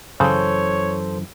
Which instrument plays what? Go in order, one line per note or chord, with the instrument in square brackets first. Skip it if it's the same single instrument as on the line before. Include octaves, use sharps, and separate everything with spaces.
[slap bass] F#2 E3 [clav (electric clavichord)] C#3 [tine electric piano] A4 C5 [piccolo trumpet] C#5